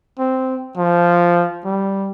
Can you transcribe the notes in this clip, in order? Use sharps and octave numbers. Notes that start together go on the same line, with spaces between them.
C4
F3
G3